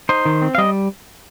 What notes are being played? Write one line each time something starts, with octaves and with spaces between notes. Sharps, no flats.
D#4 C5
D#3
C4
F5
G3 D#5